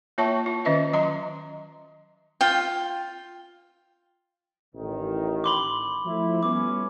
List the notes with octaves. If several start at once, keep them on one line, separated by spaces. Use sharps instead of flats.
A#3 F4 C#5 E5 A5 C#6
F4
D#3 C#4 B4 D#5 E5
F#3 D#5 A#5 C6
F4 G5
A1 D#3
B5 C6 D6
F3 A3 E4
G3 B3 C#4 D6